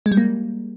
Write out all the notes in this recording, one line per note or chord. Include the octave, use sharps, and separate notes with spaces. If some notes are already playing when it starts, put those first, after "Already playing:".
G#3
G3
A#3